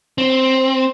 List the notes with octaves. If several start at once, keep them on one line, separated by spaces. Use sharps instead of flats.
C4